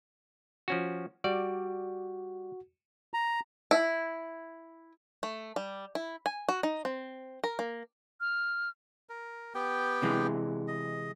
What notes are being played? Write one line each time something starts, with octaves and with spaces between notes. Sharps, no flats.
F3 C#4 F#4
G3 F#4 D5
A#5
E4
A3
G3
E4
G#5
F#4
D#4
C4
A#4
A#3
F6
A#4
B3 G4 G5
C3 E3 G#3
D#5